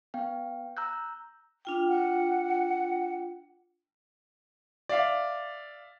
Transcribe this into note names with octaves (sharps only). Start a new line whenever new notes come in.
B3 F5 G5
A#5 E6 F#6 G6
D4 F4 G5
F#5
D5 E5 F5